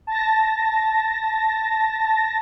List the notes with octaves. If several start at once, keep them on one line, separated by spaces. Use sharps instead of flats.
A5 A6 A#6